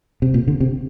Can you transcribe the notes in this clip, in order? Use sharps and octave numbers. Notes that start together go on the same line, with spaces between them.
C3
A#2
D3
C3